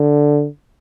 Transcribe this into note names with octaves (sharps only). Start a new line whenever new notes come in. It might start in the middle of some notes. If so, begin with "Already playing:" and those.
Already playing: D3